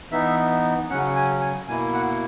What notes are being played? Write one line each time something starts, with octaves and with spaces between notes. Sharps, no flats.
E3 B3 D#4 E5
C#3 F#3 C#4 F#5
G#5
G#5
B2 A#3 E4 G#5
F#5